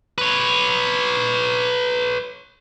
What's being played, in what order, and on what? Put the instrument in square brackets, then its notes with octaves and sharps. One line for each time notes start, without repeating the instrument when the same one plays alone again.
[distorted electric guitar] B4 C#5